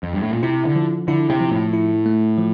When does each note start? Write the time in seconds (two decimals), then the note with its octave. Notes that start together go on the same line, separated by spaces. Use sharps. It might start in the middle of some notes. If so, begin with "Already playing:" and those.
0.03 F2
0.13 G2
0.23 A2
0.33 A#2
0.43 C3 E4
0.65 D3
0.76 F3
1.08 D3 E4
1.30 C3
1.41 F3
1.51 A2
1.73 E4
2.06 A3
2.38 F3